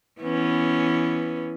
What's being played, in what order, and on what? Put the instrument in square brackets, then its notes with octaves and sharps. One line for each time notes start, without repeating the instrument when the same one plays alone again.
[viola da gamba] E3 B3 C#4